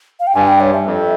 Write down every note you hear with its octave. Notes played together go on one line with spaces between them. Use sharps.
F5
G5
G2 G#5
G5
C#5
E5
F2